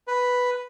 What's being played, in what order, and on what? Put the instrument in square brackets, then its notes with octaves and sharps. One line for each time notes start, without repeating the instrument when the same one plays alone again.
[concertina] B4